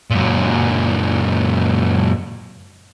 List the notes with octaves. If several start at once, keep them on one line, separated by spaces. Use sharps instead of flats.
F#2 A#2